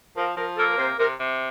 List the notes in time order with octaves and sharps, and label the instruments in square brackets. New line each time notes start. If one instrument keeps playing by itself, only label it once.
[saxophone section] F3 [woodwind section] A#4
[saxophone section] F3 [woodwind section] A#4
[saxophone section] A#3 [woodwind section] A4
[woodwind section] A#4
[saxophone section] C3 [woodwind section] C5
[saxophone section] C3 [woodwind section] A#4
[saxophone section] C3